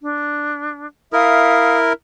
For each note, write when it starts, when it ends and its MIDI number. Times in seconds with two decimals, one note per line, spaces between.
0.01 0.87 62
1.13 1.93 64
1.13 1.93 70
1.13 1.77 76
1.13 1.77 77
1.13 1.77 87